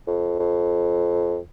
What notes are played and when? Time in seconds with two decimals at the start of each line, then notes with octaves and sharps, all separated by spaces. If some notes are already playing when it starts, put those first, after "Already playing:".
0.07 F2
0.39 F2